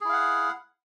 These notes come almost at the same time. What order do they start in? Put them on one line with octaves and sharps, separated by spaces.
G#4 E4 F5 F#5